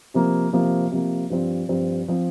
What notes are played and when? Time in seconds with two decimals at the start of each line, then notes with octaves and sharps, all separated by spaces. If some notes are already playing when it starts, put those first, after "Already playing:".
0.14 C3 F3 A#3
0.53 C3 F3 A#3
0.92 C3 F3 A#3
1.30 G2 F3 C4
1.69 G2 F3 C4
2.08 F3 C4